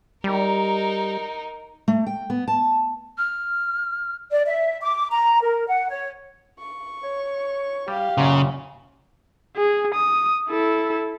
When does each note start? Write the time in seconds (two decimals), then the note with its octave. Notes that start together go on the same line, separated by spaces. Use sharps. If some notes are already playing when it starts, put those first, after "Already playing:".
0.24 G3 D#4 A#4
1.88 A3
2.07 G5
2.30 B3
2.48 A5
3.18 F6
4.32 D5
4.47 E5
4.81 D6
5.11 A#5
5.42 A#4
5.67 F#5
5.90 C#5
6.59 C#6
7.03 C#5
7.88 G3 G4 F5
8.18 F#2 A#2 C#3
9.57 G#4
9.95 D#6
10.50 E4 A4